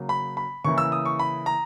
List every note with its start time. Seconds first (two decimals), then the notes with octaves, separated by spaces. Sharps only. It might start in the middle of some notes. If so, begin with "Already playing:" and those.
Already playing: C#3 F#3 A#3
0.09 B5
0.37 B5
0.64 C#3 E3 A#3 E4 C#6
0.78 E6
0.92 D#6
1.06 C#6
1.19 B5
1.46 A#5